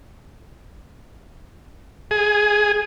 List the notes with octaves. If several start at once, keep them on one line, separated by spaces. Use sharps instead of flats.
G#4